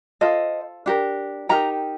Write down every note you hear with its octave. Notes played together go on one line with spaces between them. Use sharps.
F4 A4 C5 D#5
D4 G4 A#4
D#4 G4 A#4 G5 A#5